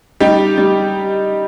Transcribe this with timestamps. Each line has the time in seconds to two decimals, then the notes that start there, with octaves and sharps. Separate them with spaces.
0.20 G3 D#4 G4
0.58 G3